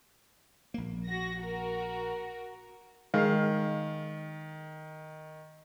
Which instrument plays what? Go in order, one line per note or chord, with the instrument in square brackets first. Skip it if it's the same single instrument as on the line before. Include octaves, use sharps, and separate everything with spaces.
[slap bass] A#1 A#3
[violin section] F#4 A#6
F#4 A#4
[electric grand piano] D#3 [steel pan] G#3 F5